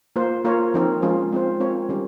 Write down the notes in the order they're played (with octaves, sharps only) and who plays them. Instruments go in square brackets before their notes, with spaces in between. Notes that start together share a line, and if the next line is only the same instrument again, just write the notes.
[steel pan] A#3 F4 C5
A#3 F4 A#4 C#5
F3 C4 D#4 A#4
F3 G#3 C#4 F4
G#3 C4 F4 C5
G#3 C4 F4 A#4 C#5
D#3 G3 C#4 G4 A#4